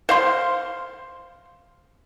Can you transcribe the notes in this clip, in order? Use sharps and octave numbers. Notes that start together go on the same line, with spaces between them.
C5 F5 C6